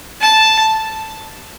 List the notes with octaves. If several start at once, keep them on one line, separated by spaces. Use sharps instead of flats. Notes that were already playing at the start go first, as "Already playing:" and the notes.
A5